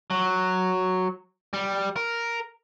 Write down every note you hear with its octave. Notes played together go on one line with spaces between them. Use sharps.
F#3
G3
A#4